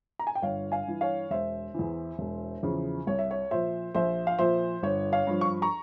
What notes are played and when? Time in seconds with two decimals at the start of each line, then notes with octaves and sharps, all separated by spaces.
0.19 A#5
0.27 G#5
0.35 G5
0.42 G1 C#5 F5
0.72 F5 G#5
0.87 G2 E3
1.01 C#5 F5
1.31 E1 C5 E5
1.74 E2 E3
2.19 E1
2.63 E2 C#3 F3
3.07 C2 C#5
3.19 E5
3.31 C#5
3.51 A#2 F3 C5 E5
3.95 A#1 C5 E5
4.27 F5
4.39 A#2 F3 C5 E5
4.83 G1 C#5
5.12 C#5 F5
5.27 G2 F3
5.41 C#6
5.62 A#5 C#6